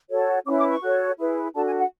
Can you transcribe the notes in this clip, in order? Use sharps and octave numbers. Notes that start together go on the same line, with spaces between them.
F#4 A4 C#5
C#4 E4 B4 D6
D6
C#6
F#4 A4 C#5
E4 G#4 B4
D4 F#4 A4 A5
G#5
F#5